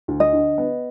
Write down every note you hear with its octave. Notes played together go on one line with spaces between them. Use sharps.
D2
D#5
D3
B3